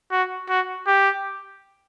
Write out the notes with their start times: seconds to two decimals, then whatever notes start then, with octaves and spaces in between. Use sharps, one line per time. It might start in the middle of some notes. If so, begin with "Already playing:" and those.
0.11 F#4
0.49 F#4
0.87 G4